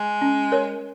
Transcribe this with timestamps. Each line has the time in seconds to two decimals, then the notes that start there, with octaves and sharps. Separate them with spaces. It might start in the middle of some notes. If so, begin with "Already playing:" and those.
Already playing: G#3
0.22 C#4
0.52 A#4 C#5